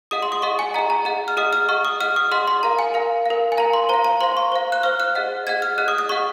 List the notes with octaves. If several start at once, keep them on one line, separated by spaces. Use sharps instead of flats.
G#4 D#5 F#5 D#6
C6
D#6
G#4 D#5 F#5 C#6
G#5
G#4 D#5 F#5 A#5
A#5
G#4 D#5 F#5
F6
G#4 D#5 F#5 D#6
F6
G#4 D#5 F#5 C#6
D#6
G#4 D#5 F#5 F6
D#6
G#4 D#5 F#5 C6
C6
A#4 F5 A#5
G#5
A#4 F5
A#4 F5
G#5
A#4 F5 A#5
C6
C5 F5 A#5
A#5
C5 F5 C6
C#6
C5 F5
F#6
C5 F5 F6
F#6
G#4 D#5 F#5
G#4 D#5 F#5 G#6
F6
G#4 D#5 F#5 F#6
D#6
D#6
G#4 D#5 F#5 C#6